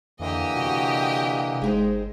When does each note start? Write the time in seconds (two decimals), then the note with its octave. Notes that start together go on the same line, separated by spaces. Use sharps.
0.20 F2 D3 E3 A#3 G4 D#5
0.57 C3 F#4
1.62 G1 G#3 D#4 C5